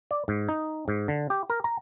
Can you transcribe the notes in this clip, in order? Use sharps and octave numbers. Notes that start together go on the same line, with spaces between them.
D5
G#2
D#4
G#2
D3
G4
A#4
A#5